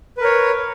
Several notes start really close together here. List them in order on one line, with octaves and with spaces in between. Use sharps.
B4 A#4 C#5